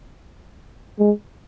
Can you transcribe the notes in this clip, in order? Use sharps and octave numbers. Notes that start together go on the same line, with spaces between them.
G#3